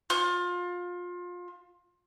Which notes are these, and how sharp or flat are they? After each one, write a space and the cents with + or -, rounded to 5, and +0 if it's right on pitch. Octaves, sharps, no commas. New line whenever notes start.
F4 +25